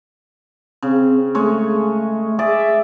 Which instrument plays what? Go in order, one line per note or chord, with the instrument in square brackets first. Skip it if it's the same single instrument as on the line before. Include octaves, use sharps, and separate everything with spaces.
[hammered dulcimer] C#3 [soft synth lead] C4
[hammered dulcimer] G#3 C#5 [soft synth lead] A3
[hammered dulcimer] G#4 D5 [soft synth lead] E5